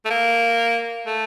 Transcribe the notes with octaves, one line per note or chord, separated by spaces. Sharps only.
A3
A#3
A3